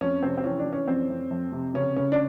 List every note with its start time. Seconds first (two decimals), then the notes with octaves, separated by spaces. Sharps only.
0.01 F2 C#4
0.23 C3 C4
0.37 C4
0.44 E3 C#4
0.59 D4
0.66 E3
0.73 C#4
0.88 F2 C4
1.10 F2
1.31 F2
1.52 C3
1.74 C#3 C#4
1.96 C#3 C#4
2.12 D4